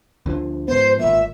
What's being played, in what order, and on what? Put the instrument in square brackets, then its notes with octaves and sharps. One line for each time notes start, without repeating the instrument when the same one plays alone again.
[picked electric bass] D2 D3 F3
[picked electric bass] G#2 F3 B3 [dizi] C5
[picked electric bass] G#1 A#2 [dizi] E5